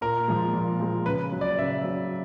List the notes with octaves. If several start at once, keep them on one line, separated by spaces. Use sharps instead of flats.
A#2 A#4
F3 G#3
A#2
F3 G#3
C#3 B4
F#3
D5
C#3 E5
F#3